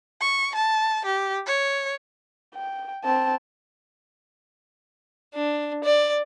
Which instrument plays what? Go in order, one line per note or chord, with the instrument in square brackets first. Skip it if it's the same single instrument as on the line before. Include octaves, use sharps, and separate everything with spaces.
[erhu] C#6
A5
G4
C#5
[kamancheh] G5
C4 A5
[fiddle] D4
D5